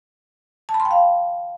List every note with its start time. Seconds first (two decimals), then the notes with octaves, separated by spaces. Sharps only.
0.69 A5
0.74 B5
0.80 C6
0.85 G5
0.91 F5